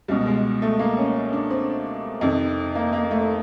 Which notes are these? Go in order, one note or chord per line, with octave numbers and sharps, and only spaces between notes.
C#2 B2 G3
G#3
A3
A#3
C#4
D4
C4
F2 C3 D#3
A#3
A#3
A#3
A3